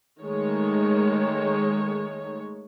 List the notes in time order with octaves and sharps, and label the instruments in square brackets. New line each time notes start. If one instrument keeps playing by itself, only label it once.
[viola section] D#3 G#3 A3 C#5